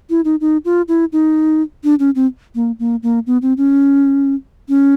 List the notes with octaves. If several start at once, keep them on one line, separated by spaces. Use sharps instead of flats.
E4
D#4
D#4
F4
E4
D#4
D4
C#4
C4
A#3
A#3
A#3
B3
C4
C#4
C#4